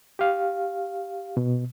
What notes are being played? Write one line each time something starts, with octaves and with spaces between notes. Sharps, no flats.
G4 F5
B2